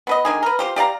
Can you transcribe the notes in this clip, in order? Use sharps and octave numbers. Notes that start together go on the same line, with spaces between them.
B3 B4 D#5
D3 D#3 G#4
A#4 B4
F4 G4 C5
G4 D5 F5 A#5